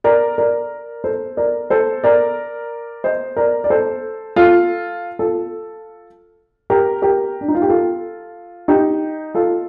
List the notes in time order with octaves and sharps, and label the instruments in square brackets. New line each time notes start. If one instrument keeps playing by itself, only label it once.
[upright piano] A#4 D5
A#4 D5
A4 C5
A#4 D5
A4 C5
A#4 D5
C5 D#5
A#4 D5
D5
A4 C5
F4 A4
F4 A4
G4 A#4
G4 A#4
D4
D#4
F4
G4
F4 A4
D#4 G4
F4 A4